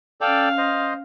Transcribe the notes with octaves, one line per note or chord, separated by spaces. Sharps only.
C#4 A4 D5 F5 G5
C5 D#5